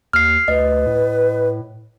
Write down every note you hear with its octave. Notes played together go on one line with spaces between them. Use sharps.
D#2 F6 C7
D2 B4 D#5
A2